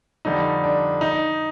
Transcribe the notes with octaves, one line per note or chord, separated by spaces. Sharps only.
F2 D3 G3 D#4
D4
D#4